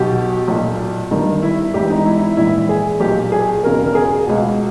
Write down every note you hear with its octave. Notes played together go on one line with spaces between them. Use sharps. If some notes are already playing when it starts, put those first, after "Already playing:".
Already playing: B1 B2 G4
B1 A#2
G1 G2 D#3
E4
G#1 G#2 E3 G4
D#4
E4
E4
A#1 G#2 E3 E4
G#4
B1 A#2 G4
G#4
E1 D#2 C#3 A#4
A#4
G#4
C#2 B2